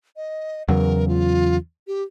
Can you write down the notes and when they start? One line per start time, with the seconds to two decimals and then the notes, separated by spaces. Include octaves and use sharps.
0.16 D#5
0.68 E2 C#3 F#3 A#4
1.08 F4
1.87 G4